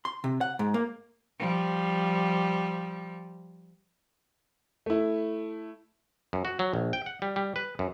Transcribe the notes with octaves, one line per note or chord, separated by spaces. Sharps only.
C6
C3
F#5
G#2
A#3
F3 G3
A3 E4
F#2
F#4
F#3
A#1
G5
F#5
G3
G3
B4
F#2